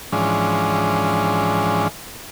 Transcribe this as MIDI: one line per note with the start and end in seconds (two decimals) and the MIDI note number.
0.12 1.88 44
0.12 1.88 52
0.12 1.88 53
0.12 1.88 56
0.12 1.88 61
0.12 1.88 62